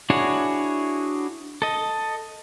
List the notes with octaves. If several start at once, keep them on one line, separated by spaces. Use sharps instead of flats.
D4 E4 F#4 G#4 C#5
A4 D#5